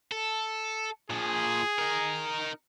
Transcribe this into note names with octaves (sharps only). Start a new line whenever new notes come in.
A4
A#2 F3 G#4
D#4 A#4